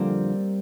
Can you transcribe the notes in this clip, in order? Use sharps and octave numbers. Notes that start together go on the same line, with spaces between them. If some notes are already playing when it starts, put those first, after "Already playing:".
Already playing: F2 D3 F3 G3 A#3 C4